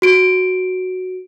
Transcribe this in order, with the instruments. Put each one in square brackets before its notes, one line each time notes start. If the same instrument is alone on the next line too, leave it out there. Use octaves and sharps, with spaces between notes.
[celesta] F#4 D7